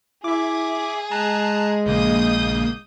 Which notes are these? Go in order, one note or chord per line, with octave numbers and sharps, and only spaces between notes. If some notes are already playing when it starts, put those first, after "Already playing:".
E4 G#4 E5 D6
G#3 A5 A#5 F#6
A#1 C#3 A#3 D#6 G6